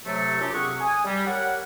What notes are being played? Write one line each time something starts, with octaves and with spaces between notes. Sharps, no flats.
C3 F#3 A3
F#2 F#3 D4 F4 G4 D6
F2 C3 C4 G#4 F#5 C#6
G#5 D#6
G3
G4 A#4 C#5 F#5